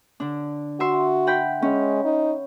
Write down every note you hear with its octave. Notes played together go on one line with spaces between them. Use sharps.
D3 D4
F#4 E5 C6
F#5 G5 B5
G#3 C#4
D#4